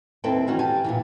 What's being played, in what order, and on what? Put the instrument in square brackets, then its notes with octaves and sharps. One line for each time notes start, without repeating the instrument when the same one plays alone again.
[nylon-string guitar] D#2 C4 E4 A4 B4 G5
D#3 E3 C#4 F#4 G5
G4 G#5 A5
A#2 C#3 E3